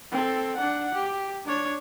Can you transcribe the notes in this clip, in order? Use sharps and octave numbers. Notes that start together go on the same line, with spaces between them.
C4 A4
D4 F#5
G4
D4 C#5